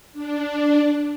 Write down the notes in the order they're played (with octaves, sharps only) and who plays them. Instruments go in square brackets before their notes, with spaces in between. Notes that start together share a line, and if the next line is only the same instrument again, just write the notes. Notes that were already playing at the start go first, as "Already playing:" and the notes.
[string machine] D4